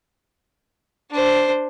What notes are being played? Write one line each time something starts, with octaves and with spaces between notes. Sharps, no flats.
D4 C5